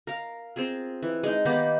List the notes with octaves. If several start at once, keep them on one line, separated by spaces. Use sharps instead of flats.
A#4 F5
C4 F4 G#4 A#4
E3
G#3 D#4
D#3 A#3 B3 G4